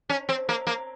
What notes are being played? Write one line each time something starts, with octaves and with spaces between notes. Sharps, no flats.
C#4
C4
A#3
A#3